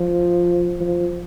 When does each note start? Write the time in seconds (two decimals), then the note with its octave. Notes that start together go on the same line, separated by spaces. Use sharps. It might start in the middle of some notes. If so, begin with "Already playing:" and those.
Already playing: F3
0.80 F3